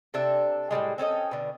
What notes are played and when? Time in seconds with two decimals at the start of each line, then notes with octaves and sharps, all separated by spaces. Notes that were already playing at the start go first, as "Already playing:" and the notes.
0.14 C3 D4 A4 E5
0.71 A2 E3 G3 G#3
0.98 C4 C#4 A4 D#5
1.31 B2 D3